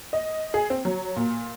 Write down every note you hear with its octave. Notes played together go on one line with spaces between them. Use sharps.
D#5
G#4
C4
F#3
A#2